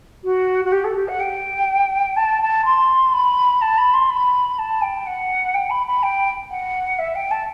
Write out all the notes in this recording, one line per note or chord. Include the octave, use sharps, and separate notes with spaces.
F#4
F#4
G4
A4
G4
F#5
G5
A5
A5
C6
B5
A5
B5
C6
B5
A5
G5
F#5
G5
B5
B5
G5
F#5
E5
G5
A5